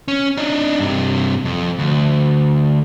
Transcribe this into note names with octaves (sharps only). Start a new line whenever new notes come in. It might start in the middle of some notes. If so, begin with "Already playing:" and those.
C#4
D4 D#4
G2 C3
F2
D2